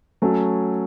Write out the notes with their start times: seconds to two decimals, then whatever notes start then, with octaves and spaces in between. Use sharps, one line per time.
0.22 F#3 A3 C#4 A4